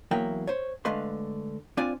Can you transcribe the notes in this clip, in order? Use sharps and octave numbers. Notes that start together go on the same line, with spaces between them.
E2 F#3 A#3 E4 G5
C5 C#5
D3 G#3 A3 B4 F5 C6
C4 D4 F4 D5 G#5